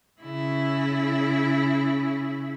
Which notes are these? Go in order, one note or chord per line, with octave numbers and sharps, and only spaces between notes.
C#3 E4